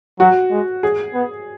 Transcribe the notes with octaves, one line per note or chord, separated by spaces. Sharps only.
F#3 F#4
G#3
G#4
B3